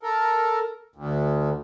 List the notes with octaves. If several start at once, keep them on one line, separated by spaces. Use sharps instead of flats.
A4 A#4
D2